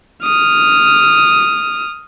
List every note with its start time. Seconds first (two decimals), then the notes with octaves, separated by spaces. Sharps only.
0.24 D#6 F6